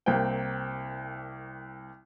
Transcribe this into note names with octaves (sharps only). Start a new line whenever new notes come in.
C2 A#3 C4 G5